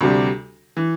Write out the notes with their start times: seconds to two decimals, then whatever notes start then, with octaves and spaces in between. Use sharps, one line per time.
0.01 D2 C3 G3
0.77 E3